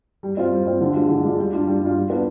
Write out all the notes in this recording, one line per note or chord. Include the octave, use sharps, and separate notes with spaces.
G3
C4 F4
G3
C4 F4
D3
G#3 D4 F4
D3
G#3 D4 F4
G3
D4 F4
G3
D4 F4
G3
B3 D4 F4